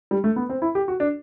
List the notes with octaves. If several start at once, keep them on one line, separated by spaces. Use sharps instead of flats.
G3
A3
B3
C4
E4
G4
F#4
D4